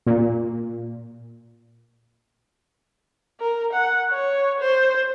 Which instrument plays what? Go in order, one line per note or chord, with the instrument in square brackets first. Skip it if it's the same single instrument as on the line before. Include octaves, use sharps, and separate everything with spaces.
[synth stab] A#2
[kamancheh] A#4
F#5
C#5
C5